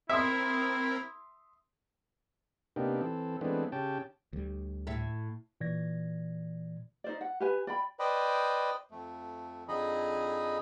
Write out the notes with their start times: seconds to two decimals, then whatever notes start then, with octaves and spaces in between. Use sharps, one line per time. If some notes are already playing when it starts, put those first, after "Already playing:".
0.09 C4 E4 A#4 E5 C6 D#6 E6
2.76 C3 A#3 B3 D4 D#4 G4
3.01 E3 C4 A4
3.41 E3 G#3 A3 B3 C4 D4
3.72 C#3 C#4 G4 G5 A5
4.33 D2 G3
4.87 A2 E5
5.61 A#2 E3 D5 G#6 A#6
7.04 D#4 C5 D5
7.21 F#5
7.40 G4 B4 G#5
7.67 D5 G5 B5
7.99 B4 C5 D5 D#5 G5 B5
8.91 F2 A3
9.68 F2 D3 D#4 G#4 D#5 B5